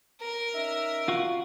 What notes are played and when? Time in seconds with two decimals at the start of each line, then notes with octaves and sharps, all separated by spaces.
0.21 A#4
0.55 C#4 D#4 E5
1.08 F4 F#4